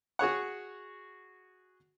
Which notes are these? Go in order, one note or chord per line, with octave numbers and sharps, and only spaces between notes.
F#4 G#4 C#5 F#5